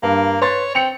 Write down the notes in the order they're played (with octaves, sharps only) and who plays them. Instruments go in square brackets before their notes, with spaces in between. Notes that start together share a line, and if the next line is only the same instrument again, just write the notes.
[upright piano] G2 [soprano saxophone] A#3
[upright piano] B4 C6 A6 [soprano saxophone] C#5
[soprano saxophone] C4 [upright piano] C#7 F7